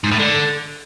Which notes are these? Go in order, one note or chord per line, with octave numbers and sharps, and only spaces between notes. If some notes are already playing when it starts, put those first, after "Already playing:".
G#2
A2
D3